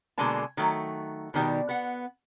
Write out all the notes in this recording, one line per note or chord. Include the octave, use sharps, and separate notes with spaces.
B2 D3 G#3 A#3 G#5 A5
D#3 F#3 A3
B2 D#3 G3
B3 F#5